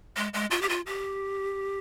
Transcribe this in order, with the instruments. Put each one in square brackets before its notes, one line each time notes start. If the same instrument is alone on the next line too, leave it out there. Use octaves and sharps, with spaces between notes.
[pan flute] G#3
G#3
F4
G4
F4
G4